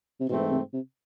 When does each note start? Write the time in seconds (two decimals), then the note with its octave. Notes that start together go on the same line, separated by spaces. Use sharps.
0.20 C3
0.28 G#2 B2 E3 A3 C4
0.51 C3
0.73 C3